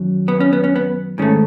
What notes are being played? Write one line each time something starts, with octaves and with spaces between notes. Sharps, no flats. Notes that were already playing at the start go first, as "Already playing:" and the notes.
Already playing: F#2 D#3 F#3
B3
C#4
B3
C#4
B3
G#2 D#3 A3 C#4